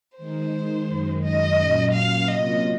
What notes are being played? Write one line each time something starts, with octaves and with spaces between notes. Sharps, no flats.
D#3 G#3 D#4 C5
F#2 D#3 G#3
D#5
A#2 F#3 C#4
F5
C3 F#3 A#3 C#4 F4 D#5